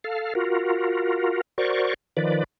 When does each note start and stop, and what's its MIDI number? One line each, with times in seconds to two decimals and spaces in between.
0.04 0.34 69
0.04 0.34 77
0.35 1.41 65
0.35 1.41 66
0.35 1.41 70
1.58 1.94 66
1.58 1.94 70
1.58 1.94 72
1.58 1.94 74
1.58 1.94 85
2.17 2.44 51
2.17 2.44 53
2.17 2.44 71
2.17 2.44 74